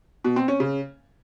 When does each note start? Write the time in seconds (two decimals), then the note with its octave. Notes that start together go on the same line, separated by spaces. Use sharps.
0.24 B2
0.36 C4
0.48 C#4
0.60 C#3